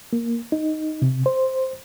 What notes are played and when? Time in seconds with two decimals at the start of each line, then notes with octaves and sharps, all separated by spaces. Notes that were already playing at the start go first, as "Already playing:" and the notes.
0.13 A#3
0.52 D#4
1.02 C3
1.26 C5